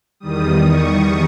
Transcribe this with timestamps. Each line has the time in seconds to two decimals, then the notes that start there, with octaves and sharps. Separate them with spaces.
0.20 E2 D#3 G3 D#6
0.65 C#6